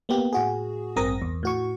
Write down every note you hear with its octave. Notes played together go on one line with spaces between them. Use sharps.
A#3 B3 G4
A2 F#4 G#4
A1 G2 C4 A#4 D#6 A#6
E2
A2 F#4 C#6